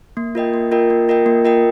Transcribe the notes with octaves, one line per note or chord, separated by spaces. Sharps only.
A#3
F4 A#4 D#5 G5
A#3
F4 A#4 D#5 G5
A#3
F4 A#4 D#5 G5
A#3
F4 A#4 D#5 G5